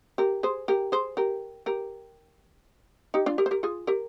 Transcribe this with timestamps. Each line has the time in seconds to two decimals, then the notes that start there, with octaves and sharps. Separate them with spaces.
0.18 G4 A#4
0.43 G#4 C5
0.68 G4 A#4
0.92 G#4 C5
1.17 G4 A#4
1.66 G4 A#4
3.14 D#4 G4
3.26 D4 F4
3.38 G4 A#4
3.46 C5
3.51 G4 A#4
3.63 F4 G#4
3.87 G4 A#4